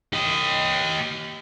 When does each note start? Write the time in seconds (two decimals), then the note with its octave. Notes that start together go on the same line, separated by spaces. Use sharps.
0.13 G4 D#5